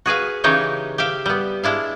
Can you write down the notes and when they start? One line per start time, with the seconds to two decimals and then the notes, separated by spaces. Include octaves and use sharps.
0.06 F#4 G#4 B4 F5
0.44 C#3 E3 D#4 G4 C#5 F5
0.98 G4 E5 F5 G5
1.26 G3 B3
1.63 G#3 D4 E4 F5